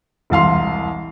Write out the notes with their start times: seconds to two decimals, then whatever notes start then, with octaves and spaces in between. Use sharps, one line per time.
0.30 E1 C2 F5 C6